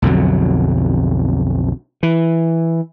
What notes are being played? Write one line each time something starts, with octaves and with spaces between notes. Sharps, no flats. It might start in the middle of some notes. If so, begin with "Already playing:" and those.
B1 F2 D3 F#3
E3